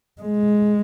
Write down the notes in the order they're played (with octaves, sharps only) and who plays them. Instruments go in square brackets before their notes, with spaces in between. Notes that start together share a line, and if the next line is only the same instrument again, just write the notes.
[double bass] G#3